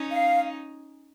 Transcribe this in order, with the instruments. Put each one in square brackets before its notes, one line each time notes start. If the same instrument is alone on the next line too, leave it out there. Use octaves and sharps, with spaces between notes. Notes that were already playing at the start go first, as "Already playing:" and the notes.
Already playing: [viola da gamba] C#4 D#4
[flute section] F5